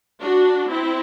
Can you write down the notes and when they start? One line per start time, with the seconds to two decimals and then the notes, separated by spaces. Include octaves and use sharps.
0.21 D4 F#4
0.71 C4 E4